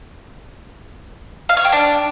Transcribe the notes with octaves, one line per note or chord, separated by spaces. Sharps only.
F5
C#5
G5
D4